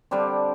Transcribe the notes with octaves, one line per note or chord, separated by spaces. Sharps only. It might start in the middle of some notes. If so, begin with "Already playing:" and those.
D3 G3 C4 D4